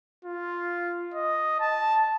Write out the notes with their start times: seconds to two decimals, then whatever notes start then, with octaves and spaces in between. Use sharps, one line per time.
0.25 F4
1.14 D#5
1.60 A5